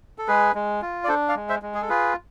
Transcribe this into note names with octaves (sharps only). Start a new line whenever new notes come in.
A4
G#3 G#4 B4
G#3
F4
D5
D4 A4 C5
D5 F5
G#3
C5 E5
G#3
G#4
A4
F4 G#4 B4